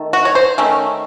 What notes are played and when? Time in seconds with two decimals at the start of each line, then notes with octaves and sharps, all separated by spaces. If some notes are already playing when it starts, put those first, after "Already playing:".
Already playing: D#3 A3
0.13 F#4
0.25 C#5
0.35 C5
0.58 D#3 A3 C#4